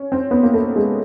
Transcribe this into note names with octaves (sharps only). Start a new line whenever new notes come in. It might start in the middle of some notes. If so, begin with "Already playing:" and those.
Already playing: C#4
C4
B3
A#3
A3
G#3